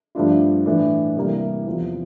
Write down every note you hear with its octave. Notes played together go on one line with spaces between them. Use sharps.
G2 F3 A3 D4 F4
A2 E3 A3 D4
C2 C3 E3 G3 A#3
E2 C3 F3